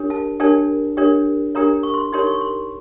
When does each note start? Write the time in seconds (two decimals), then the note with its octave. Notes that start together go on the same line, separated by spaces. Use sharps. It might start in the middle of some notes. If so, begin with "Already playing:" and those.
Already playing: D4 G4 A#4 C#5
0.10 A5
0.40 D4 G4 A#4 C#5 A5
0.97 D4 G4 A#4 C#5
1.55 D4 G4 A#4 C#5 A#5
1.83 C#6
1.94 C6
2.12 D#4 G4 A#4 C#5 C6
2.27 C#6
2.41 C6